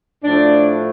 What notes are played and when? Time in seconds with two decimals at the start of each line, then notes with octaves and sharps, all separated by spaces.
0.24 A2 F3 A3 D4